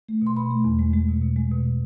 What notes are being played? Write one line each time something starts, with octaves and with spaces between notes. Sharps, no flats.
A3
B2 C6
B2 B5
A3
E2
G#3
G#3
B2
B2
G#3
B2